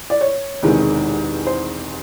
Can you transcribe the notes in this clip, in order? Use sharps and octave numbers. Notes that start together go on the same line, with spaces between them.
D5
C#5
E1 E2 C3 D#3 G#3
C5